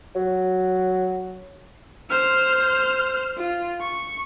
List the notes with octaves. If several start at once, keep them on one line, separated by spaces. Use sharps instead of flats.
F#3
C5 F6
F4
C#6